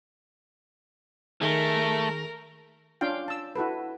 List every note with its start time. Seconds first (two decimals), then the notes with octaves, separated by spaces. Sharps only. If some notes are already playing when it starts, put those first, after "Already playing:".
1.41 D#3 A3 G#4 A#4
3.01 C#4 D4 F4 F5 G5
3.28 A5 E6
3.55 E4 F#4 A4 B4